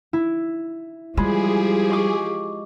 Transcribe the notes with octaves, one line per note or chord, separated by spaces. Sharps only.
E4
F3 G3 G#3 G4 G#4 B5
D#5 C#6 D6